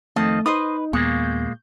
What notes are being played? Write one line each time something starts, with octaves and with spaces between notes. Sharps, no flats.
F2 D#3 A3 C4 D#5 A5
D#4 B4 C5 D#5 D#6
D#2 A#2 G#3 A#3 B3 C#6 G6